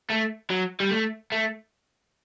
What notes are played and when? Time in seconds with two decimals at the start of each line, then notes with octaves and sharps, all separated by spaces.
0.10 A3
0.50 F#3
0.80 G3
0.91 A3
1.32 A3